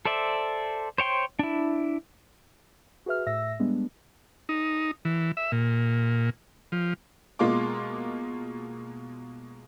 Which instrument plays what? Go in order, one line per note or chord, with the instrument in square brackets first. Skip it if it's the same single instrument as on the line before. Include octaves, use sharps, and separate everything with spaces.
[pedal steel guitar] A4 C5 D5 E5
C5 C#5 G5 C6
D4 E4
[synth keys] F#4 G#4 B4 E5 F6
A2 E5 E6 A#6
G3 G#3 B3 D4
[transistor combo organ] D#4
E3
E5
A#2
F3
[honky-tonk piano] B2 G#3 A#3 F4 C6 D6